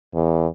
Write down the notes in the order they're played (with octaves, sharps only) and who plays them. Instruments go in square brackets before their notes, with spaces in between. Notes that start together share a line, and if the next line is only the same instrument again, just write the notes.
[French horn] E2